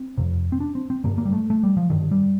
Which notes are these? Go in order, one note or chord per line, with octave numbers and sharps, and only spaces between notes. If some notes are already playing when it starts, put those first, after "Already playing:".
Already playing: C4
F2 C3
C4
D4
C4
C4
G2 D3 A#3
A#3
G3
A3
A3
G3
F3
G2 D3 D#3
G3